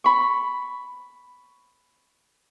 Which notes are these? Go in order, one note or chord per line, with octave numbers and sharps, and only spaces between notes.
B5 C#6